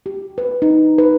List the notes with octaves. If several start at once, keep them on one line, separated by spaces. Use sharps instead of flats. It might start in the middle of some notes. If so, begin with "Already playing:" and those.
G4
B4
D#4
B4